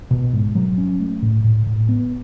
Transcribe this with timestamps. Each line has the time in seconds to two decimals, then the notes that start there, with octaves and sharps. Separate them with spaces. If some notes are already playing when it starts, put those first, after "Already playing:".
0.11 B2
0.33 G#2
0.55 F#3
0.78 C#4
1.00 A3
1.22 A2
1.44 A2
1.67 A2
1.89 B3